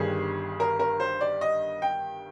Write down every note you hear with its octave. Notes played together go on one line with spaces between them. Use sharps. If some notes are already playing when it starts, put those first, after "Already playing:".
Already playing: G1 G2 D#3 G3 G#4
A#4
A#4
C5
D5
D#5
G5